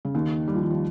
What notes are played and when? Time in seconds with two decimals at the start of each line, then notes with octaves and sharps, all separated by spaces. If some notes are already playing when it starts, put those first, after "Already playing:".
0.05 C#3
0.14 D#2 D#3
0.48 G3
0.55 F3
0.63 D#3
0.70 F3